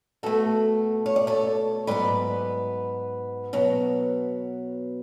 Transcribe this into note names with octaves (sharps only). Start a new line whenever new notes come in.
B2 A3 F#4 A4
C#5
D5
A4 C#5
G#2 F#3 B3 B4 D5
B2 F#3 B3